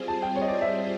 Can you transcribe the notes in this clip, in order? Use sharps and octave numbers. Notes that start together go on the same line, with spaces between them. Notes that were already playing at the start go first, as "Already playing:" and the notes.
Already playing: G3 C4 F4 G#4 C5
A5
G5
C#5
D#5
D5
E5